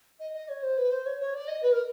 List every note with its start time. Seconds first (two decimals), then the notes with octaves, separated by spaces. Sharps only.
0.19 D#5
0.33 D#5
0.48 C#5
0.62 C5
0.77 B4
0.90 C5
1.05 C#5
1.19 C#5
1.33 D5
1.47 D#5
1.62 B4
1.72 A#4